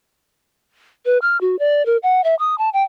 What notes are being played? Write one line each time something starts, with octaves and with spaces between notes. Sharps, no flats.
B4
F6
F#4
D5
A#4
F#5
E5
D#6
A5
G5